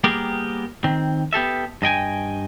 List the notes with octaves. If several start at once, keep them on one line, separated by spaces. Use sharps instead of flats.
G3 A#3 B3 G4 G#4 A#4
D#3 C4
B3 G4 A4 E5
G2 D#5 G5 G#5